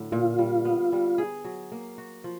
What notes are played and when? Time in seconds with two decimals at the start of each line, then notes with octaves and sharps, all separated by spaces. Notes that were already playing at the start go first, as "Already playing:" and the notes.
Already playing: A2 D3 F#3
0.12 A#2 F4
0.39 G3
0.65 B3
0.92 G3
1.18 G#4
1.45 F#3
1.72 A#3
1.98 F#4
2.24 F3